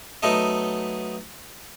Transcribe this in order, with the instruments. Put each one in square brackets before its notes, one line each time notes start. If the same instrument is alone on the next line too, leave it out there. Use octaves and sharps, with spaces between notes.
[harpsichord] F#3 A3 B3 D#4 A4 D#5